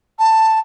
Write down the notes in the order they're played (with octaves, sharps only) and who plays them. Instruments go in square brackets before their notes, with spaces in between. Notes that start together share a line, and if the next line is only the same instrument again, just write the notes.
[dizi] A5